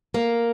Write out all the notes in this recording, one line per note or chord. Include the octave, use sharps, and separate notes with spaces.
A#3